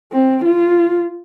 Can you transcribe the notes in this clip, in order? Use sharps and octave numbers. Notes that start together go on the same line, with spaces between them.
C4
F4